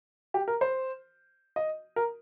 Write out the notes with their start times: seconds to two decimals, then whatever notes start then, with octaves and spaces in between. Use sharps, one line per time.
0.34 G4
0.48 A#4
0.61 C5
1.56 D#5
1.96 A#4